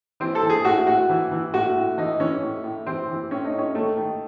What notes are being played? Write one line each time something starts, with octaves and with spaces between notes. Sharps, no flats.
E3 C4
A4
E3
G#4
A2 F#4
A2 F#4
E3
E3
A2 F#4
A2
E3 D#4
E3 C#4
A2
A2
E3 C4
E3
A2 C#4
D#4
A2
C#4
D#3 A3
D#3